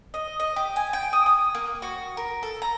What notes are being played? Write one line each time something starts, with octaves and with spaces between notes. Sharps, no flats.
D#5
D#5
G4
G#5
G5
D#6
D#6
A#3
F#4
A#4
A4
A#5